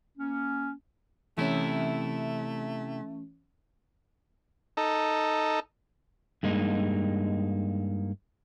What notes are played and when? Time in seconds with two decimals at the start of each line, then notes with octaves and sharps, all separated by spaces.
0.18 A#3 C#4
1.38 C3 E3 A3 C#4 E4
4.77 D#4 A4
6.43 G2 G#3 A#3 D#4